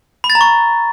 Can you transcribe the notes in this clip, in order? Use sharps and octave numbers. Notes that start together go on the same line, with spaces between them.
B5
A6
A#5
C#6